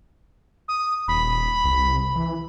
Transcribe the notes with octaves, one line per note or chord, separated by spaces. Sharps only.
D#6
D#1 B5
C2
E3